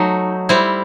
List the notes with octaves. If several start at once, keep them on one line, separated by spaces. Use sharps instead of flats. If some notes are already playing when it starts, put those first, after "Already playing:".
Already playing: F#3 A3 D#4
G3 C4 E4